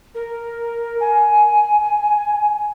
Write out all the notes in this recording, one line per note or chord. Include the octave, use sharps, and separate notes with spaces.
A#4
G#5